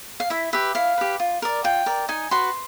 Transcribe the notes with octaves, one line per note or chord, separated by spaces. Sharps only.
F5
E4 E5
G4 B4 E5
E4 F5
G4 B4
F4
A#4 D5
F4 G5
A#4 D5
D#4 G#5
F#4 B4 C6